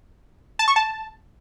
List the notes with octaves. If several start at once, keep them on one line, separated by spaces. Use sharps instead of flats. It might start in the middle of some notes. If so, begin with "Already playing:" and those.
A5
C#6
A5